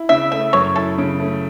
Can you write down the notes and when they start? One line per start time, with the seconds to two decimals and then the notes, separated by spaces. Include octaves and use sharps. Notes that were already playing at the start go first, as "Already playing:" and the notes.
Already playing: E4
0.09 C#3 E5
0.32 A3 E5
0.53 F#2 C#5
0.76 E4 A4
0.98 C#3
1.20 A3